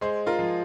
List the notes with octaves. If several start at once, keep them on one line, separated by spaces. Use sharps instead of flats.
G#3 G#4 C5
F4 A#4
F3